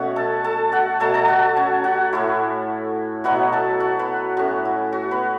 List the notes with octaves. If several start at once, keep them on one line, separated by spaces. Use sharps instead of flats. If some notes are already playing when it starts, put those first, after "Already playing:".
Already playing: B2 A3 C#4 F#4 F#5
A4 A5
A4 A5
F#4 F#5
B2 F#3 A3 A4 A5
A4 A5
F#4 F#5
C#4 C#5
F#4 F#5
A2 A3 E4
B2 F#3 B3 E4 F#4 F#5
A4 A5
F#4 F#5
B3 B4
A2 A3 C#4 F#4
E4
F#4
B3 B4